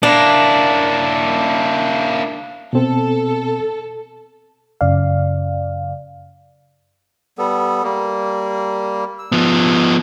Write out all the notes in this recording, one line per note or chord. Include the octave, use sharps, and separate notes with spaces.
A#3 D4 E4
B2 C4 A4
F#2 C#3 D5 F5
G3 B3 A4
G3 A#3
E6
F3 B3